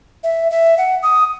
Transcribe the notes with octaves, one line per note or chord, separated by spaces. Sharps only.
E5
E5
F#5
D#6